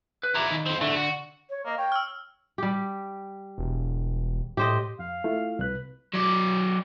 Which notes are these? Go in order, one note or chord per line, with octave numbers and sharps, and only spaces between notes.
B4
E4 F4 D5 A#5
D#3
C4 F4
C2 D3 A3
F#4
C#5
A#3 D#5
C#5 G5
E6 F6
G3 G4
E1
A2 G4 C5 D#5
F2 F5
A3 E4 F4
C2 B4 F#6
F#3 D5